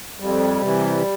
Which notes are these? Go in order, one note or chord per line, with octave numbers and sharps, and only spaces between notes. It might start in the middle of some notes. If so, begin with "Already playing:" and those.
F2 G3
C3 E3